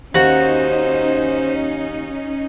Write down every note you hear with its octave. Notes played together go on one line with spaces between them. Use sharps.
D#2 C#4 D#4 F#4 C5